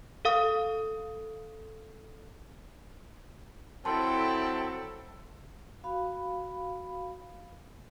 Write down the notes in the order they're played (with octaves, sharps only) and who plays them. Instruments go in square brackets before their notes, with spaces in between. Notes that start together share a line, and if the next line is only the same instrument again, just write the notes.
[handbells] A4 F5 D#6
[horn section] F#3 C4 A4 [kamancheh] E4 G5 [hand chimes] A5 C6
[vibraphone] F#4 F5 B5